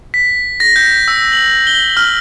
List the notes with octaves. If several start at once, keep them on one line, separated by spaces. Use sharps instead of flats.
B6
A#6
G6
E6
F#7
G7
F6